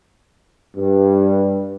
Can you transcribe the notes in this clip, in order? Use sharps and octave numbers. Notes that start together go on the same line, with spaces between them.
G2